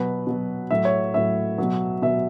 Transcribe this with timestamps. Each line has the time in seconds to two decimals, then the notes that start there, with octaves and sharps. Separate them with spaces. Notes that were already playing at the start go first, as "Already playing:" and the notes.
Already playing: B2 F#3 B4
0.27 B2 F#3
0.71 A2 F#3 E5
0.85 C#5
1.14 A2 F#3 E5
1.58 B2 F#3
2.02 B2 F#3 E5